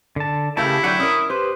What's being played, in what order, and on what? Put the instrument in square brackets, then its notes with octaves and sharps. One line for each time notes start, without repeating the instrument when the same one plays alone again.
[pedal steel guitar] D3 A5
[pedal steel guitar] C#3 G4 A5 [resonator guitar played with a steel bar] A3 A#4 F5 [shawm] E4
[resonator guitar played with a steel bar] D3 F#3 [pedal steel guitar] F#5 G5
[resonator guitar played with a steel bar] C#4 A#4 [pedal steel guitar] D#6
[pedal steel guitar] G4 B4 [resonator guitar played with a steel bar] C5